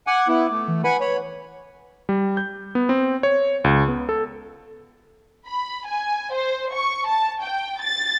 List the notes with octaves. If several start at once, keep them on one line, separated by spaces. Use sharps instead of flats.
F#5 G#5 D6
B3 E4
A3
E3
B4 F#5 G#5 B5
C#5 B5
G3
G6
B3
C4
C#5
C#2
B3
A4
B5
G#5
C5
C#6
A5
G5
A6